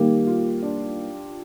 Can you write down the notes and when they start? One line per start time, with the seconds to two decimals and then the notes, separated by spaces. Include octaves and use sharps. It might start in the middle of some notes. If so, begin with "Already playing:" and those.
Already playing: D#3 G3 A#3 D#4 G4
0.27 F4
0.63 D4